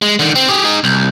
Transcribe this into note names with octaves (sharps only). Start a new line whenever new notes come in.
G#3
D3 D#3
C4
G4 G#4
D#4 G#4
C2